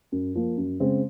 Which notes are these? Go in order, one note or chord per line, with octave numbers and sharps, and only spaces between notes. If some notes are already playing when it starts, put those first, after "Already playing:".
F#2
F3 A#3
F#2
C#3 G#3 C4